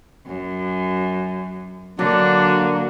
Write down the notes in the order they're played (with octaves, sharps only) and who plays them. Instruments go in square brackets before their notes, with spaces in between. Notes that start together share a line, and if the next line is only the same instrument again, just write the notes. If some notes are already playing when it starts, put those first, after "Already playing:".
[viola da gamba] F#2
[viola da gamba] D3 F#4 [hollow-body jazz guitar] F#3 [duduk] A#3 [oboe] D4